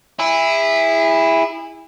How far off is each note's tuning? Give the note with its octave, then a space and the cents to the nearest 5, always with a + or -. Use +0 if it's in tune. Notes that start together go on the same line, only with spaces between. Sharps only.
E4 +0 G#4 -35